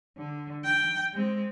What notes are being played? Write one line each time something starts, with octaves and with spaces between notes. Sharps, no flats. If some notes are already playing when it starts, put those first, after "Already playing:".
D3
G5
G#3 C4